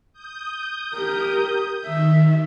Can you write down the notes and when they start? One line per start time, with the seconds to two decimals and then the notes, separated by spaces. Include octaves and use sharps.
0.13 D#6 G6
0.96 G4 A#4
1.86 D#3 E5